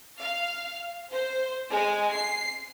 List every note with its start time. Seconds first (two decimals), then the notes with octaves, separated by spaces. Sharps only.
0.19 F5
1.12 C5
1.70 G#3
2.14 C7